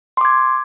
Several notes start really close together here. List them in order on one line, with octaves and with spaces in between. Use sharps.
C6 D6 G#6